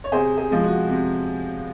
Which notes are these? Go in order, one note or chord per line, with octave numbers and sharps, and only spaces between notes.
C#5
C3 G#4 C5
G#4
F3 G#3
F#4
C3